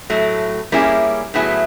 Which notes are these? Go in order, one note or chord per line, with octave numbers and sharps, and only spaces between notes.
A2 F#3 A3
G3 A#3 C#4 E4 G#4
A2 F#3 B3 E4 G#4